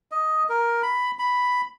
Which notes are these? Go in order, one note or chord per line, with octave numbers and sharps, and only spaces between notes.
D#5
A#4
B5
B5